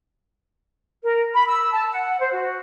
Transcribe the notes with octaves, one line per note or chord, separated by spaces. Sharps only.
A#4
B5
E6
A5
F#5
C5
F#4